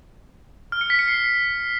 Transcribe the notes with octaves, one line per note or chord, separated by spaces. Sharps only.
F6
C#7
B6
C#7
C7